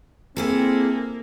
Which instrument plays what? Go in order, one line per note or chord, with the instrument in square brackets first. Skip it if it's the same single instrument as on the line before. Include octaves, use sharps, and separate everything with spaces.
[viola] A#3 [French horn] C4 [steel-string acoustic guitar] E4 G#4 A4